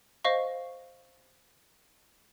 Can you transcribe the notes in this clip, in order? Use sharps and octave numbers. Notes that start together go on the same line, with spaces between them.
C5 D#5 F5 C#6